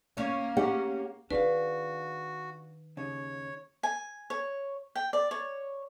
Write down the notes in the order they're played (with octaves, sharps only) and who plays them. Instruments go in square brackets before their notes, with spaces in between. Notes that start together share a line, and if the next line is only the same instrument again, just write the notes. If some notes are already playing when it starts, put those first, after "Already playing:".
[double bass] A#3 [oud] C#4 C#5
[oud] C#4 [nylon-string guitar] G4 F#5
[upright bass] D#3 [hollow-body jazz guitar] D4 G#4 F5 [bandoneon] F#4 [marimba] B4
[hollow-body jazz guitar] D#2 C#3 [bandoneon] C#5
[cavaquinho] G#5
C#5
G5
D5
C#5